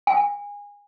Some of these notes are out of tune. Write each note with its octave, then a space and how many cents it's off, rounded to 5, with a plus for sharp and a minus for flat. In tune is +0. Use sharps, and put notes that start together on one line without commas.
G#5 -25